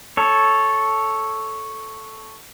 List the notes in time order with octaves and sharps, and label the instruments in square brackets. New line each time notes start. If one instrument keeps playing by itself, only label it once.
[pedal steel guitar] A4 C#5